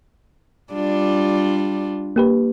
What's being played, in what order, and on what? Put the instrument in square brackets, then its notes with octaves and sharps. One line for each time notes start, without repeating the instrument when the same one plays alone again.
[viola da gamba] G3 D4 F4
[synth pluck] A#3 G4 B4